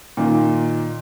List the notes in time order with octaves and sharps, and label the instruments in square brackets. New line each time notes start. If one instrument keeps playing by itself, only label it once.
[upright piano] A#2 D#3